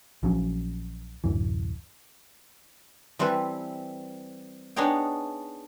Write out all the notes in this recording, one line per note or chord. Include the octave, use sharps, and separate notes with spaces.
A#1 F3 F#3 C#4
D1 A#1 F#2 E3
E3 G3 C4 A4 B4
B3 D4 D#4 G#4 C#5 G5